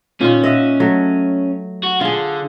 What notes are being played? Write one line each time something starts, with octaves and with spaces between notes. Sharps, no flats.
A#2 D#3 C#4 F4
D#5 E5 F#5
F#3 A3
F#4
D3 F4 G#4